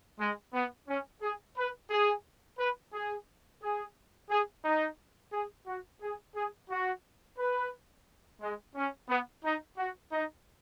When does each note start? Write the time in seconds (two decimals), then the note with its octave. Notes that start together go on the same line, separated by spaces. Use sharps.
0.19 G#3
0.53 B3
0.88 C#4
1.22 G#4
1.57 B4
1.90 G#4
2.59 B4
2.93 G#4
3.62 G#4
4.30 G#4
4.65 D#4
5.33 G#4
5.67 F#4
6.01 G#4
6.36 G#4
6.70 F#4
7.38 B4
8.41 G#3
8.75 C#4
9.09 B3
9.44 D#4
9.77 F#4
10.12 D#4